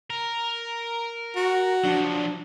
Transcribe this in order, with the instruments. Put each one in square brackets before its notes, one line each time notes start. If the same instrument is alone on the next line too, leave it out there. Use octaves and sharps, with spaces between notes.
[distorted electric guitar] A#4
[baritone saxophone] F#4
[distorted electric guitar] F3 F#3 [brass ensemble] D4